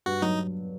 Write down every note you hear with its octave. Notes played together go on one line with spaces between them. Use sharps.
G2 F#4
F#3 D#4